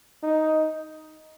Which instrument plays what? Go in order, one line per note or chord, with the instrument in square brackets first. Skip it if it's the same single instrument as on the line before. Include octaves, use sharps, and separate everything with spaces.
[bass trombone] D#4